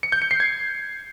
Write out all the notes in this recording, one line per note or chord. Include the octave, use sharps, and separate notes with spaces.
C#7
G6
C#7
C7
G#6